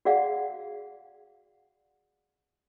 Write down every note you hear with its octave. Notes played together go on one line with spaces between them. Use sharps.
F#4 G#4 D5 F5 F#5